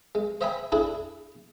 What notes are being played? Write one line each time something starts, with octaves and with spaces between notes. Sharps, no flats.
G#3
C5 D#5 E5 G5 G#5 B5
D4 E4 G#4 A4